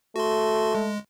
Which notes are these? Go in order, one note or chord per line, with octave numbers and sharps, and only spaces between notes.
A3 F#4 C6
G#3